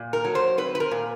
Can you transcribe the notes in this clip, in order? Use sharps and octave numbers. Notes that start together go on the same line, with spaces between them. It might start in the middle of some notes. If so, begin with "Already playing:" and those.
Already playing: A#2
A#4
F#3
C5
C4 B4
B4
A#4
A#2